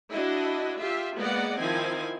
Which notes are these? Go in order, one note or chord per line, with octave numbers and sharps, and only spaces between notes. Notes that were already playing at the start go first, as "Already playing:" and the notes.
D4 E4 F#4 D#5
F4 G4 E5
G#3 A#3 B3 D5 D#5 F#5
D#3 F3 C4 E4 G#5